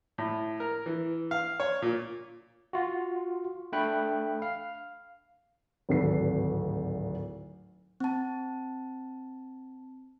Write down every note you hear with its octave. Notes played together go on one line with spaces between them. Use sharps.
A2
A#4
E3
F5
C#5
A#2
F4 F#4
A3 D4 G5 B5 F#6
F5
D1 G#1 F#4 A4 B4 C7
C4 A5